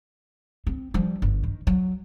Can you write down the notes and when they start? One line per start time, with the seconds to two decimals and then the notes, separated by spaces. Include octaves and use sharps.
0.67 C4
0.94 F3 G3
1.22 G1
1.44 D#3
1.67 F#3